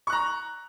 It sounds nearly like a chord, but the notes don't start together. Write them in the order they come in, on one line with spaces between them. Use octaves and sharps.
C#6 F#6 A#5